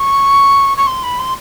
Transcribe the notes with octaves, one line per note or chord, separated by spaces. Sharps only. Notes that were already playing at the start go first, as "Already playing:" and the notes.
Already playing: C#6
C#6
C6
B5
C6